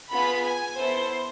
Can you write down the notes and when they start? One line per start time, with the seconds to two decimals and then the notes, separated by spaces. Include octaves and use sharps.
0.11 B3 F4 G#4 B5
0.45 G#5
0.77 B3 E4 A4 C5